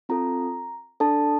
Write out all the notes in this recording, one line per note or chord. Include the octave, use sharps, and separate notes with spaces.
C4 F4 A4 A#5
D4 A4 A5